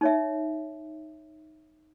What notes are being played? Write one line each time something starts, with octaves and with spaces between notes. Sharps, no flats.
D#4 C#5 E5